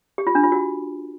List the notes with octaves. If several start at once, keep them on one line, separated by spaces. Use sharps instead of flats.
G4
F4
D4
F4
F#4